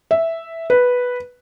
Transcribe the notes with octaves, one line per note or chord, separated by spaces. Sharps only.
E5
B4